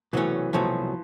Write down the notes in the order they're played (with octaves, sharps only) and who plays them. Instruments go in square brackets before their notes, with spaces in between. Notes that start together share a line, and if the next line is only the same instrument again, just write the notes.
[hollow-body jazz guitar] C2 B2 F#3 A3 C#4 [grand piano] E3
[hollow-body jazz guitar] C2 B2 F#3 A3 C#4 [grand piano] F3